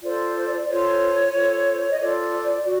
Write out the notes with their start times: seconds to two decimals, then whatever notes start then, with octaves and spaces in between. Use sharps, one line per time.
0.03 F4 A4 C5 D5
0.69 F4 A4 C5 C#5
1.34 F4 A4 C5
1.91 D#5
2.00 F4 A4 C5 D5
2.65 F#4